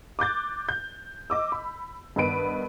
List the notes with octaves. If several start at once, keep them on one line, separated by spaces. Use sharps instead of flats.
D6 F#6 G6 A6
G6
D#5 D6 E6
B5
G2 D#3 B3 B4 D7